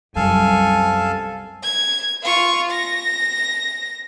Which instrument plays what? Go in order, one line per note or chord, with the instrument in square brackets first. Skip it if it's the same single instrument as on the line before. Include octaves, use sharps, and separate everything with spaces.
[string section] C2 [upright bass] F#2 [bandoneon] A4 F5 A5 [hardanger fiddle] G#5
[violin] G#6
F4 C#6
A#6